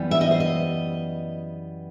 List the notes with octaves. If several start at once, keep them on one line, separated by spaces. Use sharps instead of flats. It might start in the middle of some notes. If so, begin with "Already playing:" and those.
Already playing: F#2 E3 G3 B3
E5
D#5
C5
D#5